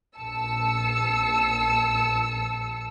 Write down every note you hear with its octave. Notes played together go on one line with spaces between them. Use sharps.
A#1 A5 E6 C#7